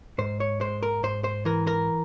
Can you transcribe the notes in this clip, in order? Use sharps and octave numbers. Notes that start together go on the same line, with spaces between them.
G#2 C5
C#5
G#3 C5
A#4
G#2 C5
C5
E3 A#4
A#4